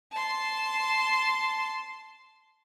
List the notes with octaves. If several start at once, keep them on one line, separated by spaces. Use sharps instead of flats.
A5 C6